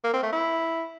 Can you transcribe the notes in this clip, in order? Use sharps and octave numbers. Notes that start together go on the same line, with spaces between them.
A#3
C4
A3
E4